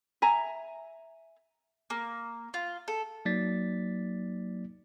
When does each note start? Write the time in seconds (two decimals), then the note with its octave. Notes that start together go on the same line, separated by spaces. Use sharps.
0.22 E5 G#5 A#5
1.90 A#3
2.54 F4
2.88 A4
3.25 F#3 A#3 D#4 D5 A6 B6